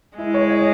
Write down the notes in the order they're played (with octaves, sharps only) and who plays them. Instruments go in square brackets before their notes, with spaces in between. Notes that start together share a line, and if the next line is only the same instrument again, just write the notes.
[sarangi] G#3 [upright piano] E4
[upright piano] C#5
D#5